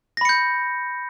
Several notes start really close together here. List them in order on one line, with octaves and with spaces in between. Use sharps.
A#6 B5 C#7 G6